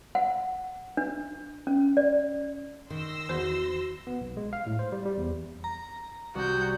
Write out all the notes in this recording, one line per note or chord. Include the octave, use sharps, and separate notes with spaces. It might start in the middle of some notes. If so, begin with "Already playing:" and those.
F#5
D4
C#4
D5
D#3 C6 E6 A#6
E2 F#4 C5
B3
B1
G#3
F5
A2
C5
G3
G3
E2
A#5
C2 F#4 G6